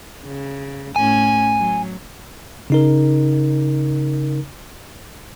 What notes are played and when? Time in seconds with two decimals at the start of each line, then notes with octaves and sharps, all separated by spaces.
0.23 C#3
0.96 A2 C#4 G#5
1.60 F#3
2.70 C#3 D#4 A#4